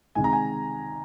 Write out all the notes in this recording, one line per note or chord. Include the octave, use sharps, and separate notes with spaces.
C3 D#3 G#3 G#5
A#5
G#5